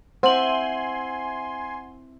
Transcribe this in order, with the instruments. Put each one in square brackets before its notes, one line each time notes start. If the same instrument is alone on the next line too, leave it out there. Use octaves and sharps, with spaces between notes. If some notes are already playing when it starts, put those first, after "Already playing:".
[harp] C4 E4 [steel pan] C5 [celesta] F#5 F#7 [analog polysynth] G#5 C6